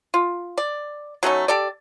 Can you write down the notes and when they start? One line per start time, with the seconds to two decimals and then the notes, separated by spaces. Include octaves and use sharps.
0.14 F4
0.58 D5
1.23 F#3 A3 C#4 D#4
1.48 G4 A4 D5